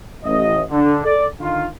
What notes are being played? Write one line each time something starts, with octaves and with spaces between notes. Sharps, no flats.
A1 D#5
D3
A4 D5
D3 D#3 F4